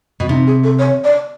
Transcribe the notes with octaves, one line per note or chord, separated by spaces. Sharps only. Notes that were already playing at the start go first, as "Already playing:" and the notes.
B2
C3 D#4
G#4
A4
C#5
D5